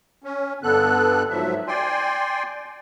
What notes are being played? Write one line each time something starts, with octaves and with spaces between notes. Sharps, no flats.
C#4
G2 D3 B3 A4 F#6
G#2 F3 F#3 E5
D5 G5 G#5 C6